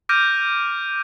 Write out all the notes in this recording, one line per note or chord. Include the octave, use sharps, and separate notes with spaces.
D6 F6 G6 A#6 D7 D#7